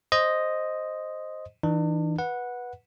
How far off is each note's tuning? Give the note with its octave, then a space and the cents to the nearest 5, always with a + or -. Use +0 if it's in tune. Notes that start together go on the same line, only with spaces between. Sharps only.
C5 +0 D#5 +0
E3 -20 D4 +40
B4 -15 F#5 -10